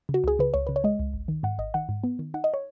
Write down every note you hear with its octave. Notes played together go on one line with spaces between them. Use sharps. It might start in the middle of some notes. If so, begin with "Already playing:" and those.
C#3
F#4
C#2 G#4
C#3 B4
C#2 C#5
C#3 B4
C#5
G#3 D#5
C#2
G#1
D#3
G#2 F#5
G#1 D#5
D#3 F#5
G#2
B3
D#3
D#4 F#5
D#5
C#5